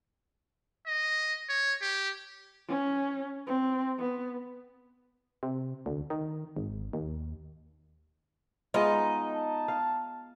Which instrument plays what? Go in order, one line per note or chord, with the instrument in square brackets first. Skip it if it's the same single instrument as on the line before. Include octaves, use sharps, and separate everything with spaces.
[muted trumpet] D#5
C#5
G4
[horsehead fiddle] C#4
C4
B3
[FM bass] C3
D2
D#3
G#1
D#2
[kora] G#3 B3 F4 [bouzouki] D#4
[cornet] A5
[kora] F5